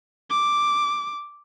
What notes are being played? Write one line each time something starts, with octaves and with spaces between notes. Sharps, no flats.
D6